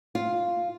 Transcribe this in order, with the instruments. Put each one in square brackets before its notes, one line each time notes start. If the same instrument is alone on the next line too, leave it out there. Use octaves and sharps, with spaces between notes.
[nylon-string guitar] F4